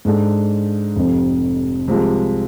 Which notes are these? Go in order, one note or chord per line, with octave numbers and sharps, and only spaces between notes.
G#2 G#3 D4 A4
F1 F2 C3
C2 C3 F3 G#3